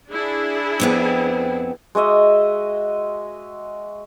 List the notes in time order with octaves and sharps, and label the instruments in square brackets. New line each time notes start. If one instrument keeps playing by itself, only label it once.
[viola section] D4 E4 G#4
[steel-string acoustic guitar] F2 B3 C4
[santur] G#3 F#4 D#5 E5